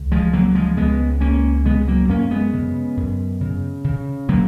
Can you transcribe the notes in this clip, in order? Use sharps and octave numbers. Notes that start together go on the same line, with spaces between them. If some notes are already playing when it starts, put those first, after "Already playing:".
Already playing: C#2
F3 G#3
C#3 F#3 A#3
F3 G#3
C#2 G#3 B3
C#2 A#3 C#4
C#3 G#3 B3
F#3 A#3
F#2 A#3 C#4
G#3 B3
C#3
F#2
C#3
C#3
C#3 F#3 A#3